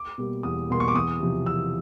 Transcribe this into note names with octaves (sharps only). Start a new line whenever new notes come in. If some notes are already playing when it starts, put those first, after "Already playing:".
Already playing: D6
B2 G3 A#3
E2 D#6
B2 G3 A#3 C6
C#6
D6
E2 D#6
C3 F3
E2 E6